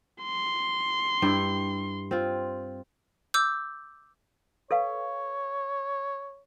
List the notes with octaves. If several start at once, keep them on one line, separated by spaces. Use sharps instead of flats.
C6
G2 E4 G4
C4 F4
D6 E6 G6
A4 B4 C#5 F5